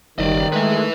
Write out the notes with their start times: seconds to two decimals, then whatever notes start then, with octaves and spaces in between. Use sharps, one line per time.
0.19 F#1 D#3 G3 D5 D#5
0.52 G#3 A3 B4 E5